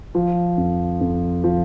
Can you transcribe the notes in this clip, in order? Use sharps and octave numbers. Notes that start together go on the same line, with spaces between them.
F3
F2
F2
F3